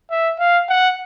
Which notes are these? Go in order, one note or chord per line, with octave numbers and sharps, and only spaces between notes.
E5
F5
F#5